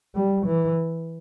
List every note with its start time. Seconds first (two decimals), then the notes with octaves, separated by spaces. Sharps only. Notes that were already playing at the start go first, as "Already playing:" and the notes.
0.15 G3
0.46 E3